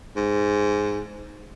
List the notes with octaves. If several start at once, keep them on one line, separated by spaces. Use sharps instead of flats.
G#2